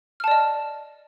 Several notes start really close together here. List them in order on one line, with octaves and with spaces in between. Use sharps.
F6 A5 D5 D#5